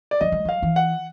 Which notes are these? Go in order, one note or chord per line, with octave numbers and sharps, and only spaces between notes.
D5
F#3 D#5
G3
F#3 F5
E3
F#5